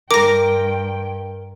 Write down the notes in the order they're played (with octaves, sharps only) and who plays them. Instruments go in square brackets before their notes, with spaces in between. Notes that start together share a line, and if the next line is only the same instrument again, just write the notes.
[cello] G2 G5 [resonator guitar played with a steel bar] A#4 [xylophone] D6 A#6